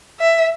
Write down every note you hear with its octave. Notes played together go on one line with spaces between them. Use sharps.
E5